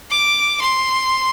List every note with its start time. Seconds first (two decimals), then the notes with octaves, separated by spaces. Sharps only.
0.10 D6
0.61 C6